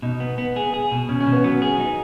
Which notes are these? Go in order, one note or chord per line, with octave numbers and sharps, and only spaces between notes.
B2 D#4
B3
B3
G#4
G#4
B2
B2 C#4
C#4
B2
B3
F#3 B3
G#4
D#4